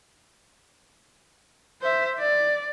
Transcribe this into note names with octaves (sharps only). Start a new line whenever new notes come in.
C5 E5
D5